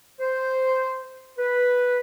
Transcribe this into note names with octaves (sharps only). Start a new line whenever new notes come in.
C5
B4